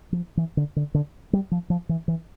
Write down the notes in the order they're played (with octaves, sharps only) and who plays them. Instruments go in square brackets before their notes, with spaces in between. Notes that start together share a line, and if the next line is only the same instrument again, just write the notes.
[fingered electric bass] F3
E3
D3
D3
D3
G3
F3
F3
E3
E3